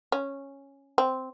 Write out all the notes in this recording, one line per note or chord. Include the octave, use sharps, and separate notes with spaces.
C#4
C4